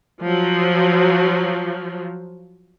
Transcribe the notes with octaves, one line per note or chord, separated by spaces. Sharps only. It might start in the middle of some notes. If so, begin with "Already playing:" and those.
F3 F#3